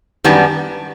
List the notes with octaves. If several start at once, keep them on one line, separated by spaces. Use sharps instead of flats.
F#2 D#3 G3 B3 D4